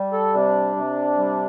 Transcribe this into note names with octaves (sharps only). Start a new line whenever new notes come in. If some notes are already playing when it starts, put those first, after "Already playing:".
Already playing: G3
A4
C3 D4
C3
G3